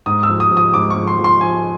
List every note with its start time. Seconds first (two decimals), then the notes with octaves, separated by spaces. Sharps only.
0.06 G#2 D#6
0.23 E6
0.29 F3
0.40 D#6
0.51 F3
0.57 D#6
0.74 G#2 D6
0.90 C#6
0.96 F3
1.07 C6
1.19 F3
1.24 C6
1.41 F3 G#5